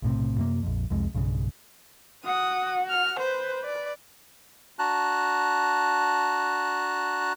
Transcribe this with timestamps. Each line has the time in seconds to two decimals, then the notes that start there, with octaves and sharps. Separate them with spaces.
0.02 B1 A2 C3
0.38 F#2 C3 A#3
0.63 A#1 F2
0.90 C2 F2 G#3
1.14 B1 G2 C#3
2.24 F#4 F#5 D#6
2.90 F6
3.19 B4 C5
3.64 D5
4.79 D4 F#4 A5 A#5 F#6